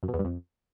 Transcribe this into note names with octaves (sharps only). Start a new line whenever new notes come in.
F#2
B2
E2
G2
F2